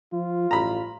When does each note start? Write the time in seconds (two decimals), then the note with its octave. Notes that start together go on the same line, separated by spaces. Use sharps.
0.13 F3 F4
0.51 A1 A#5 B5